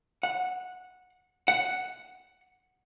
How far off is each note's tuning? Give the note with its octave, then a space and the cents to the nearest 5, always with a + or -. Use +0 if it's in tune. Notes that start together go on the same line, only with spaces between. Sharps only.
F#5 -15
F#5 +0